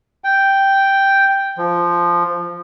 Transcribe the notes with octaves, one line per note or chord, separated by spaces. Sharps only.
G5
F3